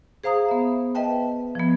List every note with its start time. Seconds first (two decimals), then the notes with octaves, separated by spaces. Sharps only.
0.24 G#4 C5 F5 A#5 D#6
0.49 B3 E5
0.95 B4 D#5 E5 G5 A5
1.55 F3 B3